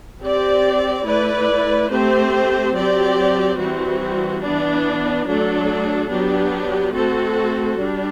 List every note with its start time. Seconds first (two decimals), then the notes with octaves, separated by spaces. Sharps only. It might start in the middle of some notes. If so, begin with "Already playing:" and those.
0.23 C4 G4 D5
1.07 A3 E4 B4 D5
1.91 A3 C4 G4 C5
2.75 F#3 C4 G4 D5
3.59 E3 G3 C4 F#4
4.42 E3 B3 D4
5.26 F#3 A3 D4 A4
6.10 F#3 B3 D4 G4
6.94 A3 C4 F#4 A4
7.78 G3 D4